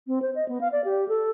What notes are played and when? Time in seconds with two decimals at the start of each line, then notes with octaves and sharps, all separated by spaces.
0.07 C4
0.22 C5
0.35 D#5
0.49 B3
0.61 F5
0.72 D5
0.85 G4
1.08 A4